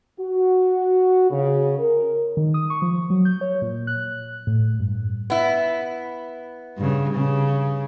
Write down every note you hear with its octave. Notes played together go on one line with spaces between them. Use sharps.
F#4
C#3
A#4
D#3
D#6
C#6
F3
F#3
G6
C#5
A#2
F#6
A2
G2
B3 E4
G2 C#3
C#3